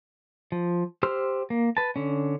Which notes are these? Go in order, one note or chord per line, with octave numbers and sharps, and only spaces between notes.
F3
G4 C5 C6 E6 F6
A#3
B4 A5
D3 C#4